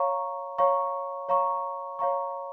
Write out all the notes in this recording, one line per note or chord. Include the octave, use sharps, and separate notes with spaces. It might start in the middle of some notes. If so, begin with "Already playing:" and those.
Already playing: C#5 F5 A#5 C#6
C#5 F5 A#5 C#6
C#5 F5 A#5 C#6
C#5 F5 A#5 C#6